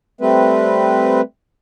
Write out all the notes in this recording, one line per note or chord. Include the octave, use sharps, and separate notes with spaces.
G3 A3 C4 B4